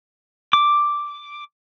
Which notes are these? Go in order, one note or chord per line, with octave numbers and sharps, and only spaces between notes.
D6